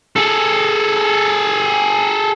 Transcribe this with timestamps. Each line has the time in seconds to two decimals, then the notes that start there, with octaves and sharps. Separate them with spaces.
0.16 G#4 A4